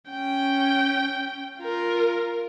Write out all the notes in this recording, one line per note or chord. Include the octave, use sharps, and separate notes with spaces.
C#4 G5
F4 A#4